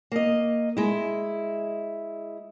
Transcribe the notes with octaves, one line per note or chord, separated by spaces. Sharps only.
A#3 D#5
G#3 E4